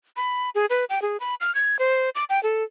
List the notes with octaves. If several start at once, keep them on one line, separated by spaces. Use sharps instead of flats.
B5
G#4
B4
G5
G#4
B5
F6
G#6
C5
D6
G5
A4